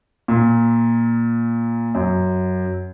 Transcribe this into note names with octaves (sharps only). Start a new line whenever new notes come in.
A#2
F#2